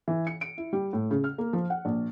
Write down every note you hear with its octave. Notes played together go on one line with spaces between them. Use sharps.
E3
C#7
D7
E4
G3
A2
C#3
F6
A#3
F3
F#5
A#1